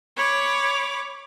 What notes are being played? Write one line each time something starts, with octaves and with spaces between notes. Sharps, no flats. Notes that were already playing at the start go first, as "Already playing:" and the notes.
C#5 B5 D6